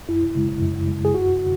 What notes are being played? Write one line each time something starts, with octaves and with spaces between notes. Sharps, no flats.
F#2 E4
C#3 G#3
F#2
C#3 G#3
G#4
F#2 F#4
D3